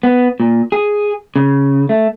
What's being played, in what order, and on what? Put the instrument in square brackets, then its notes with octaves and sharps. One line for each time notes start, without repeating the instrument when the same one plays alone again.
[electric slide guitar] B3
A#2
G#4
C#3
A3